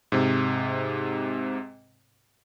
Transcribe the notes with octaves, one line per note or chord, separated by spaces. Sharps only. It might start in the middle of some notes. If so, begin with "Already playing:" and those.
G#2 C3